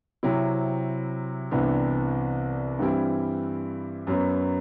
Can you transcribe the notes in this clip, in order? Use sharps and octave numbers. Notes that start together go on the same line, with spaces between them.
C3 F#3 C4 E4
C2 C3 E3 B3 D4
G2 E3 G3 C4 E4
F#2 F#3 B3